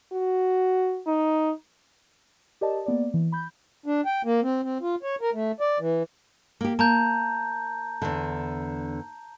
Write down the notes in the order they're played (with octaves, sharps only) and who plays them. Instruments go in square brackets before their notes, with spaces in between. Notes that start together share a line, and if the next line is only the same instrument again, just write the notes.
[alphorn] F#4
D#4
[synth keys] G4 A#4 D5 D#5 A5
A#3 B3 D5
E3
B5 G6
[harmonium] D4
G5
A#3
C4
C4
F4
C#5
A#4
A3
D5
E3
[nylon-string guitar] A#3 G4
[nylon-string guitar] A#3 [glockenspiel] A5 A#5 G6
[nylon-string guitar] E2 D3